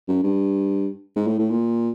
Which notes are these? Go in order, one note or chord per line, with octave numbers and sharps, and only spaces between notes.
F#2
G2
G#2
A2
A2
A#2